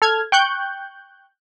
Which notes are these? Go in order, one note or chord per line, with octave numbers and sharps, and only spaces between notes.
A4 F6 G#6
G5 C#6 F#6 G6